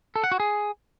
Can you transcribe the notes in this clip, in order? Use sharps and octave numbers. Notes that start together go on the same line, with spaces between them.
A4
F#5
F#4
G#4